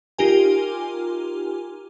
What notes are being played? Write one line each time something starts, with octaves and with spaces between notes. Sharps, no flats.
D#4 F4 G4 A#4 G#5